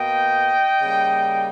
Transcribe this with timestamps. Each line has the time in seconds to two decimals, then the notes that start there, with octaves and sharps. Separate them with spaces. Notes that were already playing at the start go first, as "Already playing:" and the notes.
Already playing: B2 A#3 D#5 G5
0.81 C#3 G3 A#3